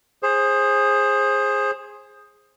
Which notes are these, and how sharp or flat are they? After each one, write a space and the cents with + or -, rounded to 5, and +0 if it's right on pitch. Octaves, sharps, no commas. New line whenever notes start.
G#4 -5 C5 +25